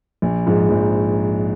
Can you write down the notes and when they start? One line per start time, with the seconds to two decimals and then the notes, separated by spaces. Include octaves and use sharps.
0.22 A#1
0.46 G#2 F3 G#3
0.70 A#1